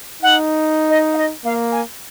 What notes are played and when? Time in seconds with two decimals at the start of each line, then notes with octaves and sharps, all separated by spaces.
0.22 D#4 F#5
0.90 D#5
1.14 F5
1.18 D#5
1.45 A#3 F5
1.72 G#5